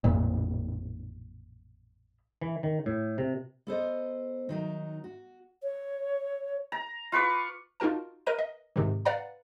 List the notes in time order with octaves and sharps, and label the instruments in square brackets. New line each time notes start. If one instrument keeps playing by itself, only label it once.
[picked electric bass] A1 F2 A#2
[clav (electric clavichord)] E3
D#3
A2
C3
[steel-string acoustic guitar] B3 A4 C5 D#5
D#3 F#3 D#4
F#4
[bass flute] C#5
[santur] A#5
F4 B4 C#6 D6
[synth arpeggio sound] D#4 F4 F#4 A#4 A5
A#4 B4 D#5 A#5 D#7
D#5
G#2 C3 D#3
B4 D5 F5 F#5 A#5